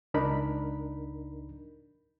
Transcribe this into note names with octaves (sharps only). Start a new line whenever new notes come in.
C#2 D4 D#4 A#4 B5